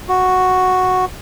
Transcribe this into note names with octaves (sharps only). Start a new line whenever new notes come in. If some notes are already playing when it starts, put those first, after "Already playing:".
F#4